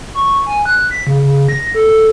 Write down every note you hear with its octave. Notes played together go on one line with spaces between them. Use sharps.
C#6
G#5
F#6
B6
C#3
C#3
A#6
A4